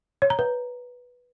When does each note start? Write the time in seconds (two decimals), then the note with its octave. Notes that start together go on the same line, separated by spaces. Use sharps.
0.22 C#5
0.30 A#5
0.39 B4